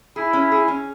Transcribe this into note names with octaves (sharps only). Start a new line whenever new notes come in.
E4 G#4
C#4
G#4
C#4